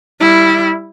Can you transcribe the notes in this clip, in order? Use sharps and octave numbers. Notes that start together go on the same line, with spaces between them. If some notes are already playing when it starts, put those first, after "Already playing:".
G3 E4